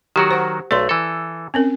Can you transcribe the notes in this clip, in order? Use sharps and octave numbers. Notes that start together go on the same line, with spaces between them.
D#3 F#3 F#4 G4
C5 F#5
B1 A3 D5 C6
E3 A4
C4 C#4 A#4